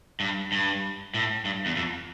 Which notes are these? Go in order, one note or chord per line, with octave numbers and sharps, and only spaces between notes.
G2
G2
A2
G2
E2
F2